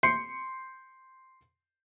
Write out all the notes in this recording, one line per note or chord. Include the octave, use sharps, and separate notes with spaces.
C6 G6 C7 C#7